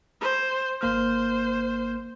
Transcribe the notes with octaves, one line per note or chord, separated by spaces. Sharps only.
C5
G#1 A#3 C5 F6